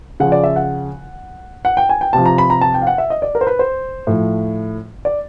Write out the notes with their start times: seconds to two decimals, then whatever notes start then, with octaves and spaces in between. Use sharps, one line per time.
0.20 C#3 F3 F#5
0.32 D5
0.44 E5
0.56 F#5
1.65 F#5
1.77 G5
1.89 G#5
2.01 G5
2.13 C3 F3 A5
2.26 A#5
2.38 B5
2.50 A#5
2.61 A5
2.74 G5
2.82 F5
2.87 F#5
2.98 E5
3.10 D#5
3.22 D5
3.35 A#4
3.41 C5
3.47 B4
3.59 C5
4.07 A2 F3
5.05 D5